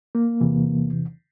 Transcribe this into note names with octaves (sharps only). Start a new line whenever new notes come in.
A#3
E2 C3 E3